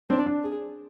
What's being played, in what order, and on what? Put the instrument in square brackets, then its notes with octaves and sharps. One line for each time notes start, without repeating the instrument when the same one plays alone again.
[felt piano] C4 [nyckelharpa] D4
[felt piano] D4
[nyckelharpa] G#4